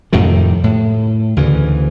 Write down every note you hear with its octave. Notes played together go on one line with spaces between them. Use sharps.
F2 A2 C3 D#3
A2
D2 C#3 E3